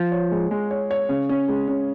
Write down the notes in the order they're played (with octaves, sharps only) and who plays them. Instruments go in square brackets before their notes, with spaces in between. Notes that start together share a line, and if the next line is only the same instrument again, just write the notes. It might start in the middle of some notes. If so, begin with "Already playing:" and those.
Already playing: [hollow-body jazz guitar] F3 [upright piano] F4
[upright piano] C#5
G#3
G#3
C#5
C#5
C#3
C#4
G#3
C#4